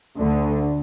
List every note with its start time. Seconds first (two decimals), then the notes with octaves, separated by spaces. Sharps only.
0.18 D2 D3